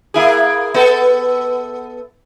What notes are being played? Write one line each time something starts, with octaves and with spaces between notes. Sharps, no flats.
A#3 E4 G#4
B3 A4